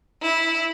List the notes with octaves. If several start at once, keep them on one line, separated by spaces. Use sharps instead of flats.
E4